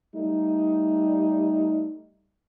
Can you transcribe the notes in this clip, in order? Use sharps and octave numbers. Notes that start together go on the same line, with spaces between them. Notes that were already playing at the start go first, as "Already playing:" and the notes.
G3 A3 D#4